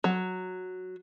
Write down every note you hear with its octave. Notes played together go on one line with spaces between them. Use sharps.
F#3